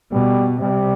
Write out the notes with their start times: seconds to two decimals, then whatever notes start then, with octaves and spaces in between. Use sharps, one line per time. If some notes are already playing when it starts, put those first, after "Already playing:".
0.12 B2 G3
0.61 C3 G3